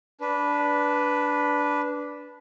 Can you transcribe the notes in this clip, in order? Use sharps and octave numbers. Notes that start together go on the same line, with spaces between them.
D4 B4